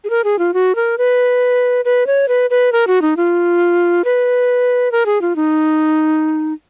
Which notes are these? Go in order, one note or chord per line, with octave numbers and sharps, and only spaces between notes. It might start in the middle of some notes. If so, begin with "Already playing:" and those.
G#4
A#4
G#4
F4
F#4
A#4
B4
B4
C#5
B4
B4
A#4
F#4
D#4
F4
B4
A#4
G#4
F4
D#4